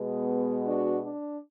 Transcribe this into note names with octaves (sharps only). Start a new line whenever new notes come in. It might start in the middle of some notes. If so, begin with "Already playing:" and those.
Already playing: B2 G#3 B3
D4 F#4
D4